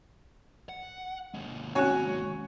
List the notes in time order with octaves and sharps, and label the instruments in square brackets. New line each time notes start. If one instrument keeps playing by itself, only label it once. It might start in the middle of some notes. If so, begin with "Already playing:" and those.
[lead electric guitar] F#5
D#2 G#3
[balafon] C4 C#4 [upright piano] F#4 C#5 G#5